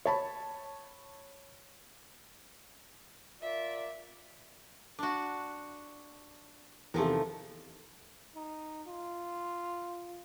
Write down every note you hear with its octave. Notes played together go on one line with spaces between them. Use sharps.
C#5 A5 B5
F4 A#4 D5 E5
D4 F#4
E2 C3 D#3 F3 A3
D#4
F4